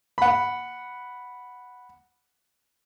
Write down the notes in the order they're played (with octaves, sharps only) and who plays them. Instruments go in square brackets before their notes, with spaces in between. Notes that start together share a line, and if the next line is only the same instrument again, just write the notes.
[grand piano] F#5 B5